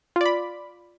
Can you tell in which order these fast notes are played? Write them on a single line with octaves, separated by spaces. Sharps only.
F4 D5 B5